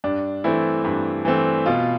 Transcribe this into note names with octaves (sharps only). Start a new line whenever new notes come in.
G2 D4
E3 A3 C4 E4
G2
E3 A3 C4
B2 F4